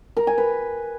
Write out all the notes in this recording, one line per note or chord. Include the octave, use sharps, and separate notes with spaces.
A#4
G#5
B4